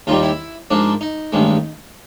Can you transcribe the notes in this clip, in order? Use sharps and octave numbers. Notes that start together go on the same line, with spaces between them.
D#2 D#3 G3 F4
E4
G#2 F3 A#3 D4
D#4
A1 G2 D#3 G#3